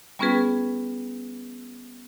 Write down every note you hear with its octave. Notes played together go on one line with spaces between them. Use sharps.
G3 B3 C#4 F4 G#4 B4